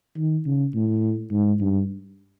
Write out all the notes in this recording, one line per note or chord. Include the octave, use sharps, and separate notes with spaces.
D#3
C#3
A2
G#2
G2